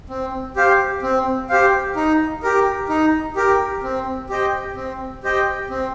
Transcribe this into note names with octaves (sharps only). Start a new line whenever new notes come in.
C4
G4 C5 F5
C4
G4 C5 F5
D#4
G4 A#4
D#4
G4 A#4
C4
G4 C5 D#5 G5
C4
G4 C5 D#5 G5
C4